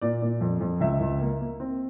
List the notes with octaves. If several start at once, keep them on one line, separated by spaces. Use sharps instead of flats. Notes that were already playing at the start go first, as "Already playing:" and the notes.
A#2 D5
A#2
F2
F2
C#2 E5
C#2
A#3
A#3
C4